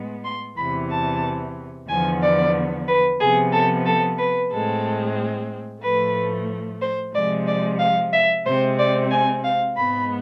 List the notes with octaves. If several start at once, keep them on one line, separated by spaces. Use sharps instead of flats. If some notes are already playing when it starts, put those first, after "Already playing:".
Already playing: A2 G#3 B3
C6
E2 C3 E3 B5
A5
E2 D3 F3 B3 G#5
D5
B4
C3 F3 B3 G#4
A4
A4
B4
A2 G#3 C4 A4
A2 F3 A3 B4
C5
C3 F3 G#3 D5
D5
F5
E5
C3 G#3 C4 C5
D5
G#5
F5
G#2 G#3 B3 B5